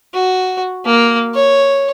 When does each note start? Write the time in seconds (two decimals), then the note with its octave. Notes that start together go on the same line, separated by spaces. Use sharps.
0.14 F#4
0.85 A#3
1.35 C#5